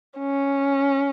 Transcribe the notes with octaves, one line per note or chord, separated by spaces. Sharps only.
C#4